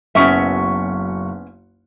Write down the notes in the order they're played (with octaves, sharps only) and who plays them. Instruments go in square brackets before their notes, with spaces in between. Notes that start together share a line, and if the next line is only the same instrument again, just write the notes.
[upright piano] F#1 B1 C#6 [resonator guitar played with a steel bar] B3 C#4 E5